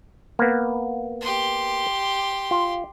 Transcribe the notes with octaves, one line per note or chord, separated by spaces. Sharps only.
A#3 B3
G4 C6
F4